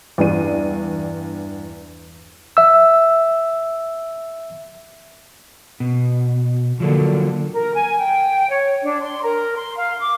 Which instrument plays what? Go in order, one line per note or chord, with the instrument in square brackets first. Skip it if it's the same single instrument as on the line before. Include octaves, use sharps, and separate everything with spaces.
[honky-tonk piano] E2 G2 D4 D#7
[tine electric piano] E5 E6
[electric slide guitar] B2
[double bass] D3 [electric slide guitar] F3 F#3 A#3
[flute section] A#4
G#5
G5
C#5
D4
C6
A#4
C6
F5
D6